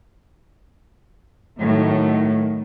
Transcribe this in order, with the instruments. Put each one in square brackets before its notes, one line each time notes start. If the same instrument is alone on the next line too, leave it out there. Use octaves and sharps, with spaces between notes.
[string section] A2 [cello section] D#3 F#3